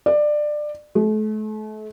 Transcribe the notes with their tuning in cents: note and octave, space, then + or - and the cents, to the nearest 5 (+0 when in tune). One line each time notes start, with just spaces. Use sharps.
D5 +20
A3 -40